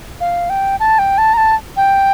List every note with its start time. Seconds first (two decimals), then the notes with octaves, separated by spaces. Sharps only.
0.21 F5
0.50 G5
0.80 A5
0.99 G5
1.18 A5
1.34 A#5
1.38 A5
1.77 G5